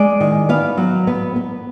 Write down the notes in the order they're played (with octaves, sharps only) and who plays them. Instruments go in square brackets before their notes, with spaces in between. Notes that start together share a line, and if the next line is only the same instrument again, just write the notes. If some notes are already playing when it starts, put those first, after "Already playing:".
Already playing: [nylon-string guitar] G#3 D5
D#3
B3 F5
F#3
B3
B3